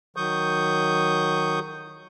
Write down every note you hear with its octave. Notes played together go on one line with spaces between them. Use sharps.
D#3 F#3 C#6 D#6 G6